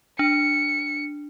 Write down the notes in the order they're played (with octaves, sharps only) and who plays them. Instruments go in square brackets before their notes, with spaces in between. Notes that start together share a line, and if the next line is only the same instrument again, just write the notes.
[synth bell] D4 [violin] C#7